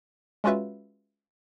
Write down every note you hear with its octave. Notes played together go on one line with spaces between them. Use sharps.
G#3 C#4 F4 F#4 B4 E5